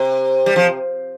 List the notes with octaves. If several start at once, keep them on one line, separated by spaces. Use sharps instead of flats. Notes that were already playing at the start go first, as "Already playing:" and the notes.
Already playing: C3
G3
F3